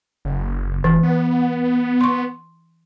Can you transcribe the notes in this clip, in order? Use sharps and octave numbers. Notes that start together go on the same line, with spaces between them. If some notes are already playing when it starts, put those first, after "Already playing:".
F#1
F1 E3
B3
C6 C#6